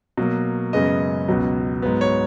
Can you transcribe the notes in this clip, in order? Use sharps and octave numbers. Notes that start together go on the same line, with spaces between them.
B2 F#3 A#3
F#2 C#3 G#3 B3 D#5
C#2 B2 F#3 B3
G#2 F#3 B3
C#5